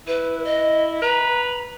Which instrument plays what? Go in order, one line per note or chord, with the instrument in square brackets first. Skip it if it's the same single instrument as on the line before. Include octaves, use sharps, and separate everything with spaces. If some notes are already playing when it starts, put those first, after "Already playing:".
[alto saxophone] E4 [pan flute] B4
[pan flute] D#5
[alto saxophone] B4 [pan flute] A#5